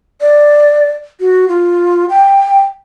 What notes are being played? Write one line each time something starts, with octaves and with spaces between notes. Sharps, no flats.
D5
F#4
F4
G5